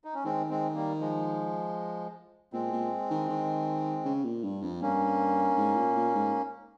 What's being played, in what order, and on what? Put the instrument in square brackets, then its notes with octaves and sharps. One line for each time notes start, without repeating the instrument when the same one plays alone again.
[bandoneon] D#4
C#4
[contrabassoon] D#3 [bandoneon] G#3 C4
[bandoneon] G#3 C4
G3 A#3
F3 G#3
[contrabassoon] A#2 [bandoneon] G#3 C4
[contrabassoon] A#2
D#3
D#3
C#3
A#2
G2
F2
[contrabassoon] G2 [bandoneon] A#3 C#4
[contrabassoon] G#2
A#2
A#2
G#2